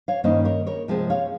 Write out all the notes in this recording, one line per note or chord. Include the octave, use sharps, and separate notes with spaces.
C#5 F5
G2 D#3 A#3 C#4 C5 D#5
A#4 C#5
A#4 C#5
C3 F3 G#3 C4
C#5 F5